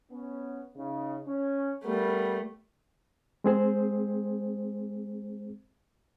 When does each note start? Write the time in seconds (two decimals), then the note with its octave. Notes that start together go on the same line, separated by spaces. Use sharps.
0.11 B3 C#4
0.76 C#3 D#4
1.27 C#4
1.84 G3 A3 B3 A#4
3.44 G#3 C4 G#4 C5